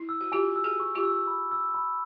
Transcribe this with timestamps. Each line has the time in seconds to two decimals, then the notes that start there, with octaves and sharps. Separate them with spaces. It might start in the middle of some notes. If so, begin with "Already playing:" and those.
Already playing: E4
0.09 E6
0.21 F#4
0.32 F4 G4 G#5
0.56 E6
0.64 F#4 G#4
0.80 C#6
0.95 F4 G4
1.04 E6
1.27 B5
1.51 E6
1.74 B5